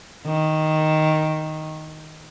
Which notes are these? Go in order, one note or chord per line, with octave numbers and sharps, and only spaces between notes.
D#3